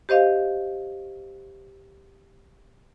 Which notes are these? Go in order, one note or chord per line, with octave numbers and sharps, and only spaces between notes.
G4 C5 D#5 F5